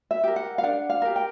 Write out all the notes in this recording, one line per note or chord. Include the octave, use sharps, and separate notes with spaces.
E5
G4 A#4
F#5
F5
D4 F#5
F5
G4 A#4
G5